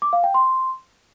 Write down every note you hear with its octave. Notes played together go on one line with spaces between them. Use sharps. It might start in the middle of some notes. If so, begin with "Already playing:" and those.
D6
F5
G5
C6